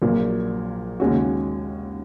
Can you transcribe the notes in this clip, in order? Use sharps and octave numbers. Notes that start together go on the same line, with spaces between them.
A#1 A#2 F#3 A#3
D#2 C#3 G#3 C#4 F#4